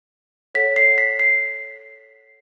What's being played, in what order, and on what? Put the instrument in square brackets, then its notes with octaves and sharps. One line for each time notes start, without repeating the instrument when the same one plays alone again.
[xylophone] A4 C#5 F#5 B6
C7
B6
C7